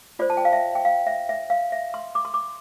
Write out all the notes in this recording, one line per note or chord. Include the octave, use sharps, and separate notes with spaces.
F4 C5 D5
A5
G5
F5
E5
G5
F5
E5
E5
F5
E5
C6
D6
C6
D6